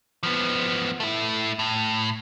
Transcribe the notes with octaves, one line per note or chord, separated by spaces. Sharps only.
F3 B3
A3 E4
A2